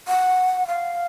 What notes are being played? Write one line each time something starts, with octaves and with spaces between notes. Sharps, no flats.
F#5
F5